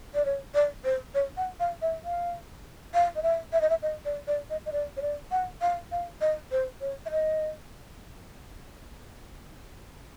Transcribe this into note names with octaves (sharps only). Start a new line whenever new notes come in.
D5
C#5
D5
C5
C#5
F#5
F5
E5
F5
F5
D#5
E5
E5
D#5
E5
D#5
D5
D5
D#5
D#5
D5
C#5
D5
F#5
F5
F5
D#5
C5
C#5
E5
D#5